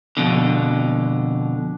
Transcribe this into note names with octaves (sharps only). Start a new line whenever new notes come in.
F2 B2 D3